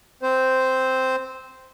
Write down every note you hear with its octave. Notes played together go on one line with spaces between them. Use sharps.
C4 C5